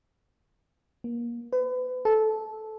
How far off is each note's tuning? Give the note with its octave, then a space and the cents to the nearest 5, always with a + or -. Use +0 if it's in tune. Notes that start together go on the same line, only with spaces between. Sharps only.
A#3 +25
B4 +35
A4 -15